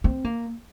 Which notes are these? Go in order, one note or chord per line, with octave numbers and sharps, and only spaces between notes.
C4
A#3